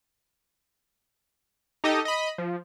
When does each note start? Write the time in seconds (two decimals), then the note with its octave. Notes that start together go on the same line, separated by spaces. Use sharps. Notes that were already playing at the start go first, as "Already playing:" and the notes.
1.84 D#4 G4 A4 D#5
2.05 D#5 B5
2.38 F3